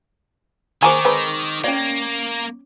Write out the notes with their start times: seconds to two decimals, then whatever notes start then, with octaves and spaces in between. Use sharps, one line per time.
0.82 D#3 A#3 G#4 C5 G#5 A#5 C#6 D6
1.05 G#3 C4 B4 A#5
1.64 A#3 C#4 C#5 D5